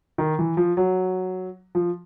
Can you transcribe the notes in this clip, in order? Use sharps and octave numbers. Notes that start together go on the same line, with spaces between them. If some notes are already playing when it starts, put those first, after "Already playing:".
D#3
E3
F3
F#3
F3